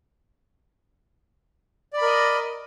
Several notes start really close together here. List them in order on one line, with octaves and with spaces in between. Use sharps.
D5 B5 A#4 D#5